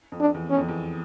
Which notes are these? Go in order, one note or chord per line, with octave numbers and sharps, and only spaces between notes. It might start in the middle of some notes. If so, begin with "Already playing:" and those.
F2
D4
E2
C#4
F2
E2